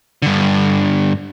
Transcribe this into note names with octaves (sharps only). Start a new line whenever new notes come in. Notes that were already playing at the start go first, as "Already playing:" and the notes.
G2 D3